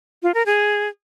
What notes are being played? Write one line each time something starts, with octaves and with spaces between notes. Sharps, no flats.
F4
A#4
G#4